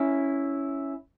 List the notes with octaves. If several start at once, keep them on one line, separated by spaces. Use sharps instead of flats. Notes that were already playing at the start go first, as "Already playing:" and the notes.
Already playing: C#4 E4